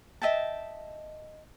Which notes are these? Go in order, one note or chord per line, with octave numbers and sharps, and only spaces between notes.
D#5 E5 G5 A5